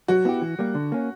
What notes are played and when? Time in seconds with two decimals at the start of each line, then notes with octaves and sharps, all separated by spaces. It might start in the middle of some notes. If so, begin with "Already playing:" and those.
0.08 F#3 F#4
0.25 B3 E4 G4
0.41 E3
0.59 G3 A#3
0.75 D3
0.92 A#3 C#4